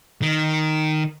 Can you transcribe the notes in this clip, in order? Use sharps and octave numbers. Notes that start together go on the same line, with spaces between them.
D#3